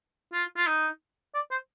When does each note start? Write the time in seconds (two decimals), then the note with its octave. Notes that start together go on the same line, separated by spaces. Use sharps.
0.33 F4
0.57 F4
0.67 D#4
1.35 D5
1.51 C5